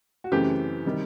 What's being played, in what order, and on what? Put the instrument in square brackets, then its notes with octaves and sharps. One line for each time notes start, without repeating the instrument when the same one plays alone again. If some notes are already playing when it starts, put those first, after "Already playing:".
[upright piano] F#4
F#2 C#3 E3 A3 C4 G4
C3 D#3 G3